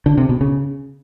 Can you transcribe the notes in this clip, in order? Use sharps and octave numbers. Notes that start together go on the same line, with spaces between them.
D3
C3
B2
C#3